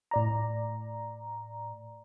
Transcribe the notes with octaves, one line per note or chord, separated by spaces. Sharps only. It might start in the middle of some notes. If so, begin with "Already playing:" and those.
A2 D5 A#5